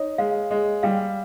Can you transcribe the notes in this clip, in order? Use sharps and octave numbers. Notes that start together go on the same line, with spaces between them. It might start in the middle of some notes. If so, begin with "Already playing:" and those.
Already playing: D#4 C#5
G#3 F5
G#3
G3 F5